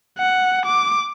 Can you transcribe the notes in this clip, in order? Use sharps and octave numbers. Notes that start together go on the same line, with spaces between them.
F#5
D6